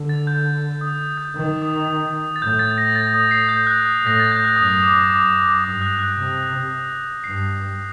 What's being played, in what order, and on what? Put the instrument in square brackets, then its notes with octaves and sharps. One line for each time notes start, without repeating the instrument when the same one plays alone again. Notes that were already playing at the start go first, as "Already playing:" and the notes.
Already playing: [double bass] D3
[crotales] A6
G6
D#6
G6
[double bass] D#3
[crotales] D#6
A6
[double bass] A2 [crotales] G6
[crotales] A6
A#6
A6
D#6
C7
G6
F#6
D#6
[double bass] A2 [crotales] A#6
[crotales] A6
G6
F#6
[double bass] F#2 [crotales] D#6
[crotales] D6
[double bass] F#2 [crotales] D6
[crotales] D6
[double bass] G2 [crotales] D#6
[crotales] F#6
F#6
[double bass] C3
[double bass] G2 [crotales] C7